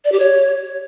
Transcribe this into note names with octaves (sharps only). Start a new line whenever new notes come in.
D5
G4
C#5